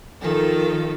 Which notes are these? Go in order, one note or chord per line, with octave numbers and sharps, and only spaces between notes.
D#3 F3 A4